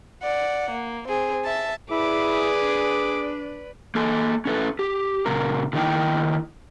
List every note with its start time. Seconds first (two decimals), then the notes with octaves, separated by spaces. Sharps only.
0.22 D5 F#5
0.71 A#3
1.08 C4 G#4
1.44 E5 A5
1.91 E4 G#4 B4 D5 D6
2.62 D4
3.95 A#3 A4 G#5
4.45 C#4 A4 B4
4.79 G4
5.26 A#2 C#3 A#4
5.73 D3 D#3 A#3 D#4 E4 G5